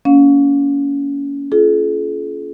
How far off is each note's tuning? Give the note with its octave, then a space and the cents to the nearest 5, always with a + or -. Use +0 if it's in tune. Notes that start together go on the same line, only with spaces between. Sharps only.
A#3 +5 C#4 +25 F5 +30
F4 -10 G#4 +45